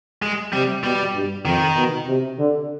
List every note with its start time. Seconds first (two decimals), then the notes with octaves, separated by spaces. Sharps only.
0.22 G#3
0.53 C3 G3
0.84 B2 G3
1.15 G2
1.45 F2 D#3
1.77 B2
2.08 C3
2.39 D3